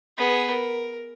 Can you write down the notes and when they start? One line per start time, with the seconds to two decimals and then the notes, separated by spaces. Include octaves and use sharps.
0.18 B3 G#4
0.50 A#4